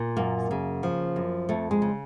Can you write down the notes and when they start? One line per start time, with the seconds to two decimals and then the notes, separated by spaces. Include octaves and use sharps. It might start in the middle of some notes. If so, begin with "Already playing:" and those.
Already playing: A#2
0.17 F#2 A#3
0.51 C#3
0.83 F3
1.16 F#2
1.49 F2 A3
1.71 G#3
1.82 C#3